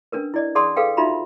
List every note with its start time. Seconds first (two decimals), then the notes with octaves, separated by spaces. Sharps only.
0.12 C#4 D4 A#4 B4
0.34 E4 D5 D#5
0.55 G#4 D5 F#5 A5 C6 D#6
0.76 G#4 A4 B4 F5 G5
0.97 D#4 F4 F#4 E5 A#5 B5